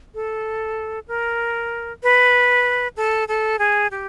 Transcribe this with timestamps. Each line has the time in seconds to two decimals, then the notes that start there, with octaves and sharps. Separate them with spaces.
0.15 A4
1.08 A#4
2.03 B4
2.97 A4
3.28 A4
3.59 G#4
3.91 G4